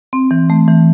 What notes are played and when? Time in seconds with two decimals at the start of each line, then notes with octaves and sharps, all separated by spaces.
0.13 C4
0.31 E3
0.50 A3
0.68 E3